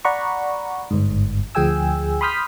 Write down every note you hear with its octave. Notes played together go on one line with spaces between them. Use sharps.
D5 F#5 A#5 B5 C#6
G1 G#2
D2 F3 G#4 G5 G#5 E6
B5 C6 D#6 F6 G6 B6